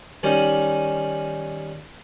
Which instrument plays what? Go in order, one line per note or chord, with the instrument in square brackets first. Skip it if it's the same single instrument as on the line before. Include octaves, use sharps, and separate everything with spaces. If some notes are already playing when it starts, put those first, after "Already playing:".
[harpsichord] D#3 G3 C#4